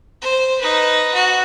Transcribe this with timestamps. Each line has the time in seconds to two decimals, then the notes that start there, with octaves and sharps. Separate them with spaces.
0.22 C5
0.61 D#4 B4
1.14 F#4